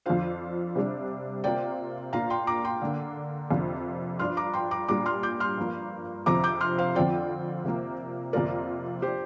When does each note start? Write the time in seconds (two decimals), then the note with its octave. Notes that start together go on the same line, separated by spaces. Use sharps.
0.06 F2 F3 D4 F4 C5 F5
0.75 C3 G3 D4
1.44 C3 A#3 F4 D5 G5
2.13 A#2 A#3 D4 F4 F5 A#5
2.30 G5 C6
2.47 A#5 D6
2.65 G5 C6
2.82 D3 A#3 D4
3.50 F2 C3 A#3 D4 F4
4.19 G2 F3 D4 F4 C6 F6
4.37 A#5 D6
4.54 G5 C6
4.71 A#5 D6
4.88 A#2 G3 D4 F4 A#5 D6
5.06 C6 F6
5.23 D6 G6
5.40 C6 F6
5.58 G2 F3 A#3
6.26 F2 C3 F3 C4 A#5 D6
6.44 D6 G6
6.60 C6 F6
6.78 C5 F5
6.95 F2 D3 F3 C4 F4 D5 G5
7.64 C3 F3 A#3
8.33 F2 C3 F3 A#3 F4 A#4 D5
9.02 F3 D4 G4 C5